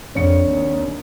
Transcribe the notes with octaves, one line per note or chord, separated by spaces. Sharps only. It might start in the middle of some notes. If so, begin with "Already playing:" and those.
A#1 F2 C4 C#5 C#7
D#2